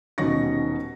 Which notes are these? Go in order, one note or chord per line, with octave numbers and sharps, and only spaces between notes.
D#1 B2 C#4 D#4 C#6 A#6